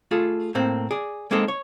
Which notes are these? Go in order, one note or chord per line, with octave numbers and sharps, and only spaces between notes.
A3 F4 G#4 A4
A2 A#3 C4
G#4 D5
G#3 A#3 C4 D#4 A4 D#5
C#5